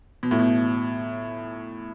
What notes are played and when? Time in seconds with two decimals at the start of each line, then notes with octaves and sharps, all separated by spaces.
0.23 B2
0.31 A2
0.39 B2